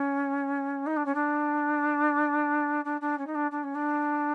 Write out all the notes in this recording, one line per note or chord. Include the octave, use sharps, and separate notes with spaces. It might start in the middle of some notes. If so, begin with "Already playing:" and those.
Already playing: C#4
D#4
D4
C#4
D4
D4
D4
C#4
D#4
D4
D4
C#4
D4